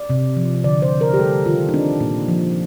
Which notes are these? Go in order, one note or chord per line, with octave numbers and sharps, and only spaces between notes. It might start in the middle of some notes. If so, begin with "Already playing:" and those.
Already playing: D5
C3
F3
D3 D5
C5
D3
A#4
G4
G3 A4
D#3 F4
D#4
C4 D4
A#2
F3